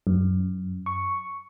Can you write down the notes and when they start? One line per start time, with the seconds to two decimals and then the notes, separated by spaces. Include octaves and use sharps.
0.07 F#2
0.86 C#6